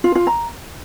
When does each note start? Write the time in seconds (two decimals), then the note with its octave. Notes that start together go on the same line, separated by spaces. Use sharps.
0.04 F4
0.15 F4
0.27 A#5